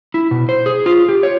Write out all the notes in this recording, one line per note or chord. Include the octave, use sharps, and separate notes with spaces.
E4
B2
C5
G#4
F4
G4
C#5